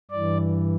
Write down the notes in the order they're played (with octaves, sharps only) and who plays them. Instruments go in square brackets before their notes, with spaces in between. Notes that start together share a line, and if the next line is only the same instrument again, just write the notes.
[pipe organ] G2 E3 D5